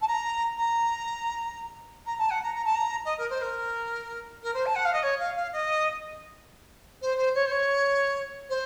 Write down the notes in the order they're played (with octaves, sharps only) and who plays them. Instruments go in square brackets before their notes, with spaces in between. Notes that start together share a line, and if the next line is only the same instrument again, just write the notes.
[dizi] A5
A#5
A#5
A#5
A5
F#5
A#5
A#5
A5
A#5
D#5
A#4
C5
A#4
A#4
C5
A5
F#5
F5
D#5
C#5
F5
F5
D#5
C5
C5
C#5
C5
C#5
C5